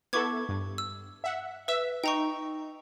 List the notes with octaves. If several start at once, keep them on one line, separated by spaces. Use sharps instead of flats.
B3 E4 A4 C#6 D6 G#6
G2
E6
E5 F#5
B4 E5 E6
D#4 G5 A#5 C#6